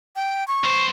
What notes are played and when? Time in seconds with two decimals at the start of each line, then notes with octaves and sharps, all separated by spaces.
0.16 G5
0.48 C#6
0.64 B1 C5